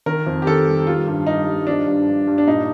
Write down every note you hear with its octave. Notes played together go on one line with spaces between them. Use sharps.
D#3 A#4
F2
G4
D#3 A4
G3
G3 F4
G2
G3 D#4
G3
F3 D4
G2
G2
G2
D4
A#2 D#4